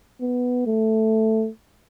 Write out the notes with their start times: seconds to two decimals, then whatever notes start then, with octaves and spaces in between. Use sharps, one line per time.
0.21 B3
0.67 A3